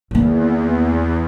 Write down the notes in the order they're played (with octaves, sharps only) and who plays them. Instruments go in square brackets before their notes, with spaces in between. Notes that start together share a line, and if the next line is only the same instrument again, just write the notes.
[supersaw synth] E2 [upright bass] D#3 A#3